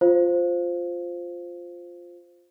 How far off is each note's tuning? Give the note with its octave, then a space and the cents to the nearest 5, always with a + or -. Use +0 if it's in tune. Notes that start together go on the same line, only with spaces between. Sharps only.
F4 +5 C5 +0 F5 +0